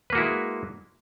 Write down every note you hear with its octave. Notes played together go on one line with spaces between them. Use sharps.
G#3 A#3 E4 F#4 B4